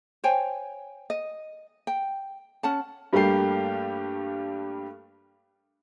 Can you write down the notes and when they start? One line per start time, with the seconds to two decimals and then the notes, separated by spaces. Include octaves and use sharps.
0.24 C5 C#5 G5 G#5
1.10 D#5
1.87 G5
2.63 C#4 F#5 A5
3.13 G2 G3 A3 A#3 G4 C7